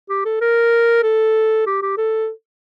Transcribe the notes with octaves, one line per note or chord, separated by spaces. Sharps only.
G4
A4
A#4
A4
G4
G4
A4